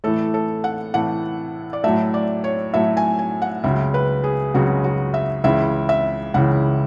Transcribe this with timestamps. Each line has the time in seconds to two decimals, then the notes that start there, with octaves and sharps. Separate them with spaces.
0.04 A2 E3 A3 A4
0.34 A4
0.64 F#5
0.94 A2 E3 A3 F#5
1.73 D5
1.84 A2 F#3 A3 E5
2.14 D5
2.44 C#5
2.74 A2 F#3 A3 E5
2.97 G#5
3.19 G#5
3.42 F#5
3.64 C#2 C#3 F#3 E5
3.94 B4
4.24 G#4
4.54 C#2 C#3 F#3 F#4
4.84 F#4
5.14 E5
5.44 C#2 C#3 E3 E5
5.89 E5
6.34 C#2 C#3 E3 F#5